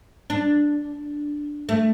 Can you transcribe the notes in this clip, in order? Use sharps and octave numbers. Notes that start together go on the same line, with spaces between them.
D4
A3